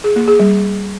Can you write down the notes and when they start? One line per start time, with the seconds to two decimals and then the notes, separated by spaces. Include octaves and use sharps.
0.04 G#4
0.16 A#3
0.28 G#4
0.40 G3